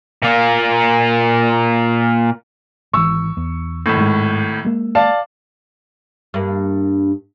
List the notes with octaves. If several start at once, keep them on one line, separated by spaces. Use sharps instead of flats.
A#2 A#3
G#1 E3 C#6 E6
E2
G#1 A2
G#2 G#3
G#3 A#3
D5 F5 A5
G2 A#3